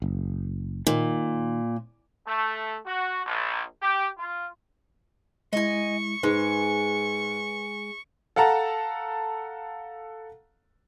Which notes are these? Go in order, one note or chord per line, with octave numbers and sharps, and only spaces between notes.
F#1
A#2 D#3
A3
F#4
A#1
G4
F4
G#3 E4 D#5 G#5 C#6
G#2 G#3 B4
A4 F5 F#5 A5 A#5